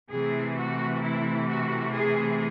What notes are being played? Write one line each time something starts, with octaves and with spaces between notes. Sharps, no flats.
C3 E3 A3 G#4
F#4
E4
F#4
G#4